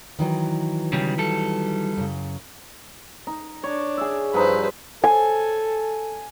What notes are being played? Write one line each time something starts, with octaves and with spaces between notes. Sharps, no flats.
D#3 E3 F#3
C#3 G3
G3 A4
F#2 C#3
D#4
D4 C#5
G#4 E5
G2 F3 D#4 B4 C5
A4 G#5